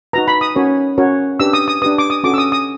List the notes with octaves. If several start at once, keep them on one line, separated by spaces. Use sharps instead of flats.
D#4 F#4 B4 A#5
B5
D#6
C#4 F#4 A#4 C#5
C#4 F#4 A#4 C#5
D4 G4 B4 E6
D#6
D#6
D4 G4 B4 D#6
D6
D#6
C#4 F#4 A4 D6
E6
D#6
D#6